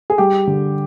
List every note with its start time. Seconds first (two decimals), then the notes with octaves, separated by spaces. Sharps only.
0.10 G#4
0.18 G3 G4
0.47 D3